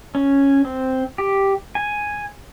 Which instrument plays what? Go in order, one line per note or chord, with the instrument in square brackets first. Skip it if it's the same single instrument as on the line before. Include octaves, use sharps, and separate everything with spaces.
[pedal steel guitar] C#4
C4
G4
G#5